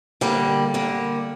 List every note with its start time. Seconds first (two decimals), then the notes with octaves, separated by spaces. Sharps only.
0.21 D3 G3 A#3
0.74 D3 G3 A#3